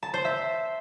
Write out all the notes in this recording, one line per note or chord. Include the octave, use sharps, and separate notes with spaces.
A5
C5
E5